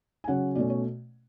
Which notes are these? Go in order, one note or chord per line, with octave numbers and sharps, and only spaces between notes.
G#5
C#3 F#3 C#4 F#5
B2 A3 C#4 D5
C#5